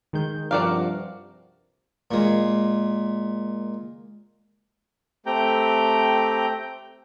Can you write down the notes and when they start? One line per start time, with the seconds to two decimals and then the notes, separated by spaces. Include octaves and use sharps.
0.13 D#3 G#3 G6
0.51 G2 C3 F3 F#4 A#4 D5 F5
2.11 A#2 G#3
5.26 A3 C4 G4 G5 A#5 G6